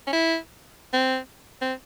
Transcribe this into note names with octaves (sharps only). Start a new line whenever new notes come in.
C#4
E4
C4
C4